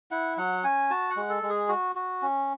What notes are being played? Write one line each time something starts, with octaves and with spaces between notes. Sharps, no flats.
E4 F#5
F#3 F#5
C#4 G#5
F#4 A5
F#5
G#3
A4
G#3
G#4
F#4
F#4
C#4